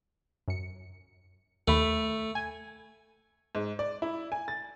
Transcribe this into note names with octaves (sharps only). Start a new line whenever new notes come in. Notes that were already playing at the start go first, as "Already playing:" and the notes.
F#2 C#7
D#2 A3 B5
G#5
G#2
D5
E4
G#5
A6